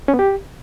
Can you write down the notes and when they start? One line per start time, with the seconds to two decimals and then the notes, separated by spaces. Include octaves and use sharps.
0.08 C#4
0.14 B3
0.19 G4